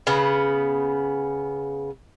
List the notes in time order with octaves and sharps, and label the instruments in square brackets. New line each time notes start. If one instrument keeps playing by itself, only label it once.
[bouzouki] C#3 B3